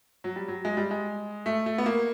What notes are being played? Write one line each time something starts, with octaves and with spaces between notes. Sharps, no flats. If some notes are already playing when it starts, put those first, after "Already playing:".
F#3
G3
F#3
G#3
G3
G#3
A3
A3
B3
A#3